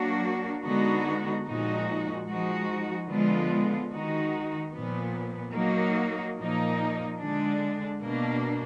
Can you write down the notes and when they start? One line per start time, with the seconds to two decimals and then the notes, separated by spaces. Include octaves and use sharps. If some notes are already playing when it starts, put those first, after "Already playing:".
Already playing: F#3 A#3 D4 F#4
0.63 D3 G#3 B3 D#4 F#4
1.46 A#2 F3 G#3 D#4 F#4
2.28 F3 G#3 D#4 F#4
3.09 D3 F3 G#3 B3 F4
3.91 D#3 G#3 D#4 F#4
4.73 A#2 F3 B3
5.54 F#3 A#3 D#4 F#4
6.38 A#2 F3 A#3 D#4
7.19 D3 G#3 D4
8.01 B2 A#3 D4